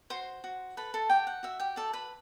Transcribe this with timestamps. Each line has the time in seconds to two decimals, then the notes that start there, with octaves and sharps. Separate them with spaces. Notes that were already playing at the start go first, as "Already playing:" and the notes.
0.10 F#4 C5 C6
0.44 F#4
0.77 A4 B4 B5
0.94 A4 A5
1.09 F#4 G4 G5
1.27 F#5
1.43 F#4 E5
1.60 G4 G5
1.76 A4 D5 A5
1.93 B4 B5